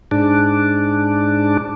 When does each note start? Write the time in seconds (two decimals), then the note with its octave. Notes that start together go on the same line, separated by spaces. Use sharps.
0.11 G#2 D4